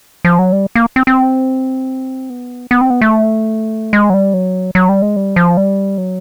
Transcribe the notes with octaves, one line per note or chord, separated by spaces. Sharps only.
F3
F#3
G3
A#3
C4
C4
B3
B3
C4
B3
A3
G#3
F#3
G3
F#3
F#3
G3
G#3
G3
F3
G3
F#3